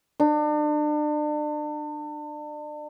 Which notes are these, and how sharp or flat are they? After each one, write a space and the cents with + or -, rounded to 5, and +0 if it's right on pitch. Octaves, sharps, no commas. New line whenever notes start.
D4 +35